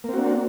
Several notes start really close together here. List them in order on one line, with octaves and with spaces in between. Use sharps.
A#3 C4 F#4 D4